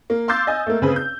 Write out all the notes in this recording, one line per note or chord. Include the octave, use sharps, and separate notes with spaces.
A#3
F5 C6 D6 E6 G6 A6
D#5 G#5
A3 A#3
C#3 C4 G#4 B4
G6